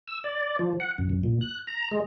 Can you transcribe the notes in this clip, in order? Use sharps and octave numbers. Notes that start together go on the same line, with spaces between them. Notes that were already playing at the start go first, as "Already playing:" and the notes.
E6
D5
F3
F#5
F#2
F#2
A#2
F#6
A#5
G#3